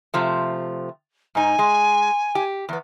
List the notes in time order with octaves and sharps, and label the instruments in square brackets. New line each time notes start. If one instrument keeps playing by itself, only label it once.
[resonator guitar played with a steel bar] C3 F3 A3
[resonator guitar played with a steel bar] G#2 D#4 [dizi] G#5
[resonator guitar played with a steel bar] G#3
G4
E2 B3